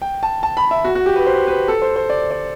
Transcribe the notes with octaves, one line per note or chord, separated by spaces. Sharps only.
G5
A5
A5
B5
E5
F#4
F#4
G4
B4
C5
B4
A4
C5
C5
D5
D5